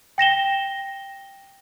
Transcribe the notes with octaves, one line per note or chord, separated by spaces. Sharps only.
G5 A#6 E7 G7